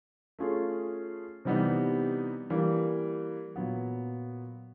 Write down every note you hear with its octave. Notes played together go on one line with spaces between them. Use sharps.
A3 C#4 F4 G#4
C3 E3 G3 B3 D#4
E3 G3 A#3
A#2 F#3 B3